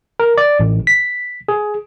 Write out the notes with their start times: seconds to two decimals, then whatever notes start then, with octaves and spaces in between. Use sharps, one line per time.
0.20 A#4
0.38 D5
0.60 A1
0.87 B6
1.48 G#4